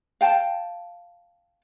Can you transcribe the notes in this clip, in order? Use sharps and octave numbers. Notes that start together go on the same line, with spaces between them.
F5 G5 A5